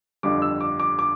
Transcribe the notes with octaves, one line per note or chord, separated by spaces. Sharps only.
G1 F2 D3 G3 D6
E6
D6
D6
D6